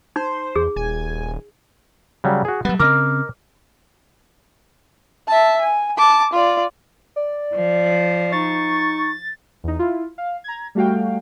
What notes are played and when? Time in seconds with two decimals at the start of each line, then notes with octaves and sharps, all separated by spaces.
0.16 D#4 C5
0.56 E2 G#4
0.76 D#1 G#5
2.24 C#3 F#3 G3
2.45 F#4 G#4
2.65 F#3 G3 B3
2.79 C#3 C4 A#4 D#5 D6 F6
5.28 E5 A5
5.61 G#5
5.97 A5 D6
6.33 F4 D5
7.16 D5
7.55 F3
8.33 D#4 C#6 A6
9.64 E2 D#4
9.79 E4 F4
10.18 F5
10.44 A#5 G#6
10.75 G3 A3 F#4 F5 G5